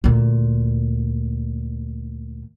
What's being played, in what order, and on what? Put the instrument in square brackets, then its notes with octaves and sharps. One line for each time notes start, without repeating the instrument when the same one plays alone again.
[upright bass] D2 A#2